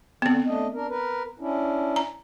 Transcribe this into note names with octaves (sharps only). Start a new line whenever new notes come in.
D3 B3 C4
A3 D4 D#5
D4 A#4
A#4 B4
C#4 D4 E4
A#5